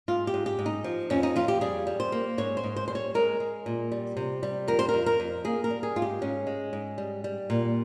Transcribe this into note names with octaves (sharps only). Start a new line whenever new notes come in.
G#2 F4
G4
G#2
G4
G#2
D#4
F3
F2 C#4
D#4
F2 F4
G4
G3 G#4
G3
C5
A#3
G#2 C#5
C5
G#2
C5
G3 C5
C#5
G#3 A#4
G#3
A#2
G3
C3
G3
F2 A#4
C5
F2 A#4
A#4
F2
A#3 G#4
A#4
G3
G#4
G#2 F4
G4
G#2 C#4
G#3
G#2
G3
G3
A#2